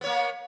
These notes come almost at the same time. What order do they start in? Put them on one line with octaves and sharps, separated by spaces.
B3 C#5 A#3